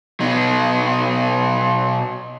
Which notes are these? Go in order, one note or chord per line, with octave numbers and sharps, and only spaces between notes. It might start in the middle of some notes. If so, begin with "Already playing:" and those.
B2 D#4